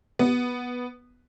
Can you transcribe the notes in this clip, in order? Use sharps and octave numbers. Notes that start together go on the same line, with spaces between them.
B3